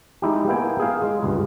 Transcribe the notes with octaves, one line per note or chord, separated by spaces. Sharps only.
G#3 D#4 E4 G4
A#3 B3 E4 G5 G#5
G#4 F5
G#3
C#2 G2